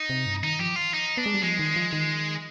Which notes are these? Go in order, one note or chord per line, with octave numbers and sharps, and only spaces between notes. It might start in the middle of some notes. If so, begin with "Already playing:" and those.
Already playing: D#4
C3
G2
D#3 D#4
F3 G4
F4
D#4
B3 D4
G#3
G3
F3 G#3
D#3
F3
D#3